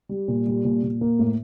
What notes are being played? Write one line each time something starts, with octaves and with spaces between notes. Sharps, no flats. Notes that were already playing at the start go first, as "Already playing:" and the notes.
G3
A#2
G3
A#2
A#2
A#3
A2